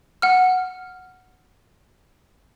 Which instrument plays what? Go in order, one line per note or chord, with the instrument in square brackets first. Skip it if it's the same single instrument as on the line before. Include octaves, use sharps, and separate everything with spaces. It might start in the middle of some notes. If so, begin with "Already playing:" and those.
[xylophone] F#5 F6